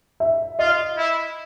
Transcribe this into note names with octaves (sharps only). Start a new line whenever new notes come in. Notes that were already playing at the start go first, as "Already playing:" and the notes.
E5
F4 D#5
E4